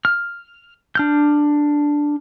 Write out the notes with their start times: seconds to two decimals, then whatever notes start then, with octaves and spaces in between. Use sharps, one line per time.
0.05 F6
0.95 D4 F6 G6